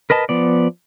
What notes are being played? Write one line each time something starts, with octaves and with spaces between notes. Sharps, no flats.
A#4 B4 D#5 A5
F3 B3 D5